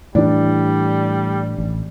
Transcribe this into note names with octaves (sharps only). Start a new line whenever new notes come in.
A2 E3 G3 D4 D5
A1